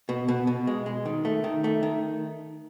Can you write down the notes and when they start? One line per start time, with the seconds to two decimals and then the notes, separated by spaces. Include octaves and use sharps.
0.09 B2
0.28 B2
0.47 B2
0.67 G#3
0.86 G#3
1.06 D#3
1.25 A3
1.44 D#3
1.64 A3
1.83 D#3